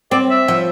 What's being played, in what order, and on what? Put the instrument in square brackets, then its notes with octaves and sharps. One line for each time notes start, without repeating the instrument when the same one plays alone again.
[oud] C4 [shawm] D5
[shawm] E5
[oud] F3